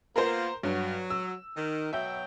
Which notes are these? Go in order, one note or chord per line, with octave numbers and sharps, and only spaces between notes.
A#3 B3 F4 A#4 C5
G2 F#3
E6
D#3
B2 F#3 E5 G5